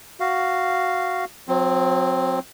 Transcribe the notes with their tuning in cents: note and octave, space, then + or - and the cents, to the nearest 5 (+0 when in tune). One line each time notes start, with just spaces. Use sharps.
F#4 +0 F5 -5
F#3 -40 C4 +0